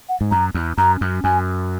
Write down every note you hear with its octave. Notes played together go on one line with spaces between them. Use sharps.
F#5
G#2
F#2 A#5
E2
F#2 A#5
F#2
F#2 G#5